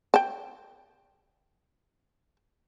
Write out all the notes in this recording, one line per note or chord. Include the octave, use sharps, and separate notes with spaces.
G5 A5